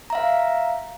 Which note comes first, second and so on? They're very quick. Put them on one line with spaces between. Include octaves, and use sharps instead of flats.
A#5 E5 F5